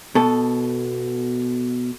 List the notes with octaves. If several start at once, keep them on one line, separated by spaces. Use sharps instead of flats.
B2 A4